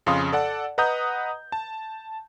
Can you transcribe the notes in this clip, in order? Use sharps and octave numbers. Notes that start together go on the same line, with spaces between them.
F2 C#3 F5 C6 D#6
A4 D5 F#5 A5
B4 D#5 F#5 A#5 D#6 G6
A5